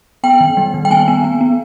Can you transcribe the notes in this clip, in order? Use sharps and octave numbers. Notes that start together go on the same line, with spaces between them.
B3 G5
D#3
G3
D#3
G5
B3 G#5
B3
B3
B3